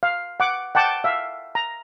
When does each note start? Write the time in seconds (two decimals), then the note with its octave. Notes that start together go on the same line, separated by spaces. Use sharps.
0.03 F5
0.40 F#5 D6
0.75 F#5 G5 A5 D6
1.04 E5 F5
1.55 A#5